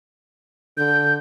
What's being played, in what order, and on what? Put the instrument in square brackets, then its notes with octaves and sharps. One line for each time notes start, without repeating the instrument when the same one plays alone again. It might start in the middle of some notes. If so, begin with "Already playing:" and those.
[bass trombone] D3 [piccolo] G6